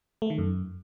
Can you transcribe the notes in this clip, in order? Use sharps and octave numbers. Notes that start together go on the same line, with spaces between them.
A3
D#3
F#2